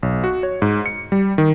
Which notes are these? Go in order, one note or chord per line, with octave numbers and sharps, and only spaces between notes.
B1
F#4
C#5
G#2
C#7
G3
D#3